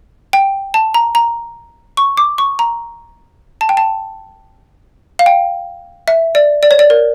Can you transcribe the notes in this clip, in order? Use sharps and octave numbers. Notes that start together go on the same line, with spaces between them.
G5
A5
A#5
A#5
C#6
D6
C#6
A#5
A5
G5
A5
F5
G5
E5
D5
D5
C#5
D5
A#4